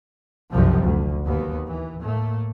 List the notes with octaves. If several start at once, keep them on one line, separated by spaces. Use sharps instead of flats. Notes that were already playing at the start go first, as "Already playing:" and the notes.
F#1 C2 F#2 C3 F3 G3
D2
D#2 B3
E3
A2 A3 A#3